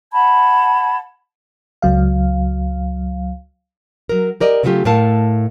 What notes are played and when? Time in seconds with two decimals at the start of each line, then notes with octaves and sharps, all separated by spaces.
0.13 F#5 A5 B5 G#6
1.82 C#2 F#3 F5
4.09 F#3 A#4
4.40 G4 A#4 D5 D#5
4.63 C#3 F#3 A3 B3 F4 G4
4.85 A2 A3 A#4 F5 A5